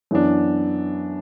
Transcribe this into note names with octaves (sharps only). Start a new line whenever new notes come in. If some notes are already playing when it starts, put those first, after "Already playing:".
F#2 E3 B3 D4